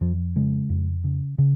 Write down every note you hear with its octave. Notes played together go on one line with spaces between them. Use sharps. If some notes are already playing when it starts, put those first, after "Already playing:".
F2 F3
C#3 G#3
F2
C#3
C#3